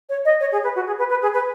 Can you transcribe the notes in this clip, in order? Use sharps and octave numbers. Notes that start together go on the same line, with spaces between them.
C#5
D#5
C#5
G#4
B4
F#4
G#4
B4
B4
G#4
B4